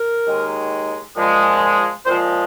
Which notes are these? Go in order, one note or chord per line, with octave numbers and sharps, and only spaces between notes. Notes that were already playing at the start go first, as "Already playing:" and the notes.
Already playing: A#4
D#2 D#3 G#3
A#2 F3 G#3
A#2 F3 G#3 C5